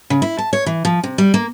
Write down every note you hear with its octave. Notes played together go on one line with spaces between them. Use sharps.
C#3
E4
A5
C#5
E3
F3
C3
G3
A#3